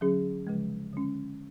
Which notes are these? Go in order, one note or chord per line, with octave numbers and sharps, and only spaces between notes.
D3 F#3 C#4 G#4
C#3 F3 G#3
D3 G#3 C#4